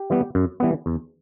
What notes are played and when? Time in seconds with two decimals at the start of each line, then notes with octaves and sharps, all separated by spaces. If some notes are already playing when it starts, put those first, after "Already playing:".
Already playing: G4
0.10 E3 G3 B3
0.35 F#2
0.60 E3 G3 B3
0.86 E2